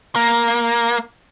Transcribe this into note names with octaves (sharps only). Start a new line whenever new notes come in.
A#3